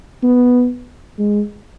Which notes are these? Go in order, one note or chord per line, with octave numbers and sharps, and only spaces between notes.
B3
G#3